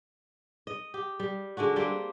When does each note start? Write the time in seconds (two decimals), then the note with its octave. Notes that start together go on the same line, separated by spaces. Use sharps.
0.67 D#5
0.94 G4
1.20 G3
1.57 D3 G#3 D4 F#4
1.76 G3 A#3 C4 D5